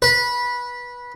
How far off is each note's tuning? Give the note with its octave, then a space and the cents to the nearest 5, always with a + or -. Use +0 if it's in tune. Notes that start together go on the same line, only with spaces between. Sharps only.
B4 -15